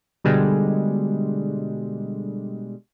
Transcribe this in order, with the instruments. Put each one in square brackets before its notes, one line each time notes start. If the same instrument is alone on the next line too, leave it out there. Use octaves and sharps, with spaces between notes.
[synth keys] B2 D3 G3 G#3